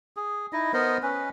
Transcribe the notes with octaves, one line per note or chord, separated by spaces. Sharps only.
G#4
D#4 E4 D#5
B3 A#4 C5 D#5
C#4 B4